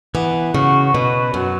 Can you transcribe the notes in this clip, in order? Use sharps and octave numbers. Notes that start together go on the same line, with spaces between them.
E3 B3
C#3 F#4
B2 B4
F#2 F#3